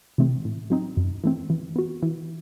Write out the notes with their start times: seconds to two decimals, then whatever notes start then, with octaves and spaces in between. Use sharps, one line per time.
0.18 C3 E3 A3 C4
0.45 A2
0.70 F#3 C4 D#4
0.97 F#2
1.24 E3 A3 C4
1.50 E3
1.76 B3 F#4
2.03 E3